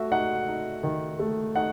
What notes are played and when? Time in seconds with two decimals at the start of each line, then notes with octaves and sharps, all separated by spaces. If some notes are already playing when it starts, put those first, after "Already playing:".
Already playing: A3 F#4 E5
0.12 D#4 F#5
0.48 D#4
0.83 D#3
1.19 A3
1.56 D#4 F#5